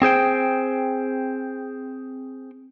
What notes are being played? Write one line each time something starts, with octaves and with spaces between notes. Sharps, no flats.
C4 G#4 C5 G5